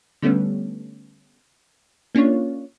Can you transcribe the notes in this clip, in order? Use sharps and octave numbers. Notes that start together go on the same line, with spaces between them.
D3 G3 A3 B3 C#4
A#3 C#4 D4 F4 C#5